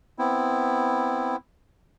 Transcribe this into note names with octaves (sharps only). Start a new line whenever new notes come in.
B3 C4 E4